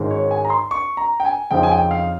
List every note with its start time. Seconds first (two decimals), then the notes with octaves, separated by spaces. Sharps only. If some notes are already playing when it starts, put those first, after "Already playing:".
Already playing: G#1 G#2 D#3 G#3 C#4
0.11 C#5
0.31 G#5
0.45 A#5
0.50 C6
0.71 C#6
0.97 A#5
1.20 G5
1.25 G#5
1.51 F2 C#3 F3 C4 D#4 G5
1.63 G#5
1.71 G5
1.91 F5